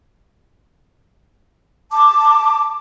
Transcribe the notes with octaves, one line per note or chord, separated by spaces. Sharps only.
A5 D6